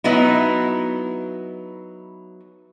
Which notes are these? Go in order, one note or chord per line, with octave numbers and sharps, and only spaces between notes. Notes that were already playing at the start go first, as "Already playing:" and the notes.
F#3 B3 D#4 E4